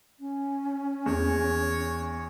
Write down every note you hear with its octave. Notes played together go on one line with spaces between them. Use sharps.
C#4
E2 C#5